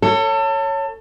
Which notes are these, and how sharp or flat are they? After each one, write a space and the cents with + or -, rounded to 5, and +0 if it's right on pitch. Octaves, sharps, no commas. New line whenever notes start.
A4 +30 C#5 +0